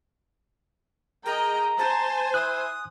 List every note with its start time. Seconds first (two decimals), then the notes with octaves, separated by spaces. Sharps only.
1.25 G#4 A#4 D#5 G5 A#5
1.79 C5 G#5 A5
2.34 E4 D#6 F#6